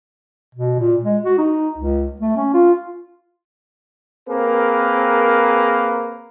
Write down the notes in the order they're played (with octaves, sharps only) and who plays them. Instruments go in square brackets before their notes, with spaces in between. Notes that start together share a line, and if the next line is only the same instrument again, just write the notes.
[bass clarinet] B2
A#2
G#3
F#4
D#4
C#2
A3
C#4
F4
[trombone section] A#3 C4 G#4 A#4 B4